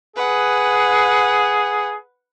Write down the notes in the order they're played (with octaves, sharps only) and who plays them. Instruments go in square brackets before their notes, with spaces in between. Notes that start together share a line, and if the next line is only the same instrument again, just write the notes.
[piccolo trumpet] G#4 [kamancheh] B4 F#5